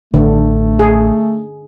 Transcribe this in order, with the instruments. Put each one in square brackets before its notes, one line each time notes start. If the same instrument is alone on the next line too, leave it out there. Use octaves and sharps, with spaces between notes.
[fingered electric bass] A1 [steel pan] D3 [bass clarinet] A3
[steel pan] G#4